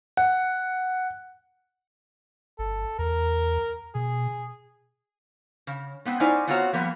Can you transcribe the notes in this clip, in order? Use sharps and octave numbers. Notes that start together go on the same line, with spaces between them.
F#5
G1 A4
E2 A#4
B2 G#4
C#3
G#3 B3 C4
C#4 D#4 E4 C5 D5 G#5
B3 C4 F4 F#4 C#5 A#5
F3 G3 A#3 B3